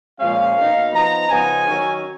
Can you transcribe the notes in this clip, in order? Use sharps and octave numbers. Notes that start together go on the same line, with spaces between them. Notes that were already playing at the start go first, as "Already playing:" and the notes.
A#2 F3 G#3 C#4 F5
B2 A#3 D#4
F3 B3 D#4 A#5
C#3 F3 B3 D#4 G#5
D#3 F#3 C#4